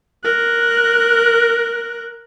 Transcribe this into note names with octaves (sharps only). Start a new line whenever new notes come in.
A#4 F#6